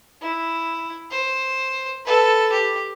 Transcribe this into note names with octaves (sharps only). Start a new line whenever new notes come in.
E4
C5
A4 B4
G4